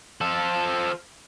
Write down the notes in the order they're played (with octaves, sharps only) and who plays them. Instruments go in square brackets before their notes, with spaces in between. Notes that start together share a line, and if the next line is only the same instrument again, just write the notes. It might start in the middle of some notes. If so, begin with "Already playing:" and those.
[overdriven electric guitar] F3 A4